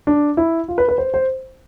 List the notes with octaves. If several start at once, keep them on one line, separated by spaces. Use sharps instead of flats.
D4
E4
F4
B4
B4
C5
C5